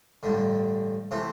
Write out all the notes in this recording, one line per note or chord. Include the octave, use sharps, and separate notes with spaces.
A1 G2 D3
C3 E3 A3 C4